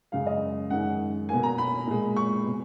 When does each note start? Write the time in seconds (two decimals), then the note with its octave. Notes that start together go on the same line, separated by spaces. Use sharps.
0.12 F#2 C#3 G#3 F5
0.27 D#5
0.70 F#2 D#3 G#3 F#5
1.29 B2 A#3 G#5
1.43 A#5
1.58 B5
1.87 A#2 G#3
2.16 C#6
2.46 B2